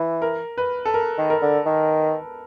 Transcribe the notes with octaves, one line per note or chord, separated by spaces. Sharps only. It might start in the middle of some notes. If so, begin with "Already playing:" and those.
Already playing: E3
A#4
B4
A4
A#4
D#3
A#4
D3
D#3